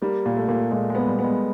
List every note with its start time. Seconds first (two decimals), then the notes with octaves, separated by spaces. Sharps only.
0.02 G3 A#3
0.26 A#2
0.37 A3
0.48 A#2
0.71 A#2 G#3
0.90 G#3
0.95 B3
1.07 G3
1.19 B3
1.24 G#3